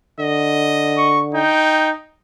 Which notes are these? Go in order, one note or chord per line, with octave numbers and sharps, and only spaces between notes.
D3 D#5
C#6
D#4 G5